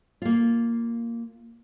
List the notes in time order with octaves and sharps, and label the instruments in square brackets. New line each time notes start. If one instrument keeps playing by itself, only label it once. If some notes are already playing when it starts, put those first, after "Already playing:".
[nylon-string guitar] A#3 F4